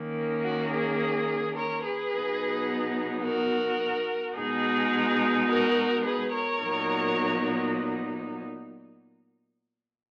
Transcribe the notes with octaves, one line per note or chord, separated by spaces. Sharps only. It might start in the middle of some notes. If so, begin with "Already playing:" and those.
Already playing: D#3 A#3 C#4
F#4
G#4
A#4 C#5
G#4 B4
B2 F#3 B3 D#4
F#4 A#4
B2 G#3 D#4 G#4
F#4 A#4
G#4 B4
A#4 C#5
A#2 F#3 B3 D#4